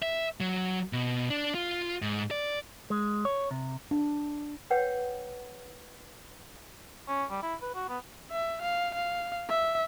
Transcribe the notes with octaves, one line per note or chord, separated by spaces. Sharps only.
E5
F#3
B2
D4
F4
G#2
D5
G#3
C#5
C3
D4
B4 C#5 F#5 G5
C#4
G3
E4
B4
F#4
B3
E5
F5
F5
E5